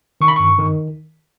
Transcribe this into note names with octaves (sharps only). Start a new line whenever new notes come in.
D#3 C#6
B5
G2 C#6
D#3